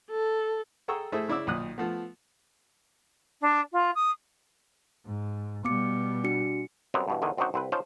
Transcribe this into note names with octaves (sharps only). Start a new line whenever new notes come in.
A4
G#4 A4 G5 A#5 C#6 E6
A3 E4 G#4 C5 E5
C#3 E4 D5 D6 E6
B1 A#2 D#3 D#6 F#6
F3 A3 B3
D4
F4
D#6
G#2
B2 G3 B3 D6 C#7
D4 F#4 C#7
F#2 G3 B3 C4 G#5 A#5
G2 B2 E3
E2 D3 D#3 F5 G#5
F#2 C4 D4 D#4 F#4 C5
C2 C4 E4 B4
C#4 D#4 F4 C5 C#5 A5